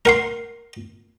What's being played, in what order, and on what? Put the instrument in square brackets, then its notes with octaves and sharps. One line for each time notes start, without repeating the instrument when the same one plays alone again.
[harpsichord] A#4 F#5 C6